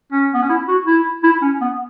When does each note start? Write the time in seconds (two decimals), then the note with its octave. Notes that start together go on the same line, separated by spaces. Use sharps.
0.12 C#4
0.34 B3
0.42 C#4
0.49 E4
0.68 F#4
0.87 E4
1.24 E4
1.42 C#4
1.61 B3